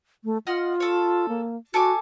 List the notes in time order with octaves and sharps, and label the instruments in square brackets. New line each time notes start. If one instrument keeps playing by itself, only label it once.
[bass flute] A3
[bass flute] F4 [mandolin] D#5 F#5 F6
[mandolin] A4 C#5
[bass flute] A#3
[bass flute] F#4 [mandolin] A4 G#5 D6